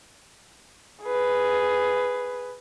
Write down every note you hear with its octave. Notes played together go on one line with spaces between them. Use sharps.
G#4 B4